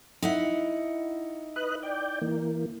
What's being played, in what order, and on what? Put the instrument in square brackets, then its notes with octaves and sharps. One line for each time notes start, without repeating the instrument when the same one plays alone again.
[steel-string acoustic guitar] D#4 E4 F#5
[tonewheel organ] B4 D#5 F#6
D5 G5
E3 A#3